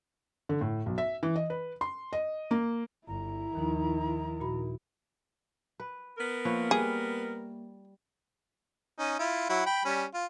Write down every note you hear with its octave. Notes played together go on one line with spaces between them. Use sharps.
D3
A2
B1
E5
E3
D#5
B4
C6
D#5
A#3
G1 E4 A#5
D#2 D#3 F3 D#4
A#2 F#4 B5
B4
B3 A#4
F3 A#3 B4 C#5
G3 G#4
C#4 D#4
E4 F4
F#3 E4 F#5
G5 B5
G3 C#4
F4